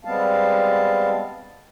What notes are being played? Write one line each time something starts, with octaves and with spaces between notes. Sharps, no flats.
G3 G#3 B3 C4 F5 A5